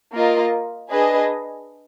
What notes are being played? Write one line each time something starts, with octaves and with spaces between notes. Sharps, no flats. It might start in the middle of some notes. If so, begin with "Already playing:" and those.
A#3 F4 A#4 D#5
D4 G#4 B4 D#5